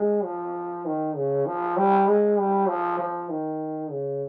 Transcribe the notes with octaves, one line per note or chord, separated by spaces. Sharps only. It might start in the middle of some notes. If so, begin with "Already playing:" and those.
Already playing: G#3
F3
D#3
C#3
F3
G3
G#3
G3
F3
F3
D#3
C#3